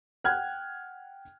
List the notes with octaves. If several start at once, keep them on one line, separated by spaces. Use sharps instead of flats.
F#5 G5 F6 F#6 G#6